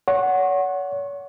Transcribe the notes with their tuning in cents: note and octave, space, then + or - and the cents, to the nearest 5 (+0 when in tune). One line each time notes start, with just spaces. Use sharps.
C#5 +40 F#5 +0 C#6 -40